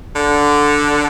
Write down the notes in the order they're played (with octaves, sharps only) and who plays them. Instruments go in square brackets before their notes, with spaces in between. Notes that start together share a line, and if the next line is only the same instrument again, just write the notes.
[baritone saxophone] D3